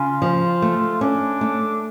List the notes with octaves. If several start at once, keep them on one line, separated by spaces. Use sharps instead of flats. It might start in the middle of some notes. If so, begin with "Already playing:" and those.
Already playing: C#3 F4
F3
A3
C#4 D4
A3